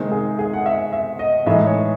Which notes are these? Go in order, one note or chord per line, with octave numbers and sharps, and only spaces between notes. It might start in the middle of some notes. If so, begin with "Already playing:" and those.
Already playing: C3 D#3 G#3 C5
G#4
G#4
F#5
E5
E5
D#5
A2 E3 G#3 D#4 E5
C#5